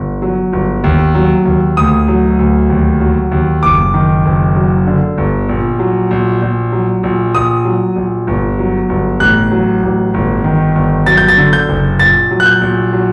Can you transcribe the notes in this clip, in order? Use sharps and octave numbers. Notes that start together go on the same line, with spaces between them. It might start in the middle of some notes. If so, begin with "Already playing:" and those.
Already playing: G1
F#3
G1
D#2
F#3
D#2
D2 D#6
F#3
D2
D#2
F#3
D#2
F#1 D6
D#3
F#1
F#3
D3
G1
A#1
F#3
A#1
A#1
F#3
A#1
A#1 D#6
F#3
A#1
G1
F#3
G1
A1 F#6
F#3
A1
G1
D#3
G1
F#3 A6
G6
A6
D3
G6
F#1
A#1 A6
F#3
F#6
G6
A#1
F#3